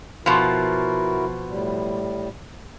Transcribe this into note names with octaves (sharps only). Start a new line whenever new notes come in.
B2 F3 E4 F#4 A#4
A2 G3